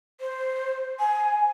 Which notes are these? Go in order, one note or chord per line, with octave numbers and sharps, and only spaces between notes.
C5
G#5